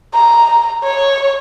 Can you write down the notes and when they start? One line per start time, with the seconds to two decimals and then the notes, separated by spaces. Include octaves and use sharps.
0.14 A#5
0.84 C#5